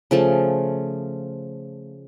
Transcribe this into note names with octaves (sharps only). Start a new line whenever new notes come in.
C#3 F3 A3